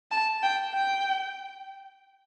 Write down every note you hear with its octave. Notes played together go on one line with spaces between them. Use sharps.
A5
G5
G5